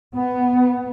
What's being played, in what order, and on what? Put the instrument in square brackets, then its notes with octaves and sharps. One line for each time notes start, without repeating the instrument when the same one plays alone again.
[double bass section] B3